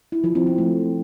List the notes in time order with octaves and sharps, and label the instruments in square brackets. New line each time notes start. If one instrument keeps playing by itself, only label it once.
[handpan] E4
F3
C4
F3
A3